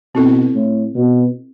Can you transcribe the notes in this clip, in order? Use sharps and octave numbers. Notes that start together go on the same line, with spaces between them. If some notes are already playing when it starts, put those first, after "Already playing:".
B2 C4 E4 A4
A2
B2